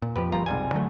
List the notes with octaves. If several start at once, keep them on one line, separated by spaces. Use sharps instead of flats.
A#2
F2 F3 G4 B4
G1 A#2 F3 G3 F4 A#5
F1 B1 G#2 C3 G3 G#5
D3 F#3 A3